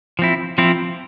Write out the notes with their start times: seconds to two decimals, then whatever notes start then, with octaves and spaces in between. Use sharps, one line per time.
0.19 F3 C4 E4
0.58 F3 C4 E4